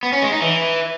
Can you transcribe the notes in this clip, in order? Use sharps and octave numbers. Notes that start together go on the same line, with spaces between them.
B3
C#4
G#3
D#4
E3